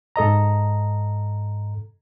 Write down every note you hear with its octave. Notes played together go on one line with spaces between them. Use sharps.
G#2 A4 D#5 A#5